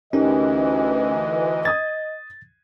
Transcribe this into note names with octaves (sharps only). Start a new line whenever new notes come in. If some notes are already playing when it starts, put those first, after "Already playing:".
D2 E3 C#4 D#4 G4 A#4 D#5
D#6 G#6 A6